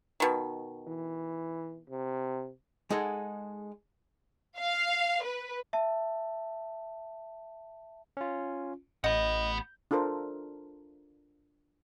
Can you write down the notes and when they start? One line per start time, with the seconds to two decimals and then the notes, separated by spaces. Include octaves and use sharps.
0.20 B2 D#3
0.87 E3
1.90 C3
2.90 G#3 D#4 G#4 A4 F#5
4.57 F5
5.22 B4
5.73 E5 A5
8.17 C#4 F4
9.04 A1 D#5 F#5 B5 G6
9.91 D4 F4 A4 A#4 C5